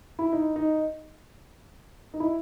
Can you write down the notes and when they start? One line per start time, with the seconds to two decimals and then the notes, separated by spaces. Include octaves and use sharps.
0.19 E4
0.33 D#4
0.56 D#4
2.14 D#4
2.20 E4